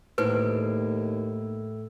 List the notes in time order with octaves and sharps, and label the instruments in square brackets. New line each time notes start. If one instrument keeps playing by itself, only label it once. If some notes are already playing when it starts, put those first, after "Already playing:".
[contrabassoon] D#2 [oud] A2 [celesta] E4 C5 D7 [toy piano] B4